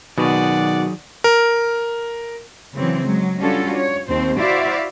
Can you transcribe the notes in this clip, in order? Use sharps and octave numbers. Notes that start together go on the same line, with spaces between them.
B2 D#3 F#3 G#4 D5 F#5
A#4
C#3 E3 F#3 C4
F#3 G#3
G3 C#4 D4 F4 F#4 A4
C#5
D#2 C4 C5
E4 F#4 C5 D5 E5 F5